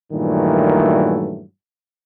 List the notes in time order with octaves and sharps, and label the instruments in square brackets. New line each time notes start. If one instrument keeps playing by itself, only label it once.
[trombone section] G2 A#2 D#3 E3 F#3 A3